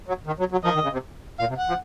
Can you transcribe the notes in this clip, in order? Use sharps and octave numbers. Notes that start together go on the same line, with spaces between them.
F#3
D#3
F#3
F#3
F3 A#4 D#5
D#3
C#3
C3
A#2 F5
C3
F#5
F3